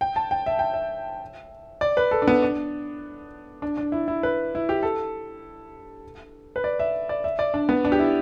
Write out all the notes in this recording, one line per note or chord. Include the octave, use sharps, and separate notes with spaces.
G5
A5
G5
E5
G5
E5
D5
B4
A4
D4
B3
D4
D4
D4
E4
E4
B4
E4
G4
A4
B4
D5
E5
D5
E5
D5
D4
B3
D4
G4
E4